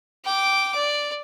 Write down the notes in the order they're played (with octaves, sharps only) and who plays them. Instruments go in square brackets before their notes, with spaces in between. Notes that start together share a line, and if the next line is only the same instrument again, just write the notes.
[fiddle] G5 D6
D5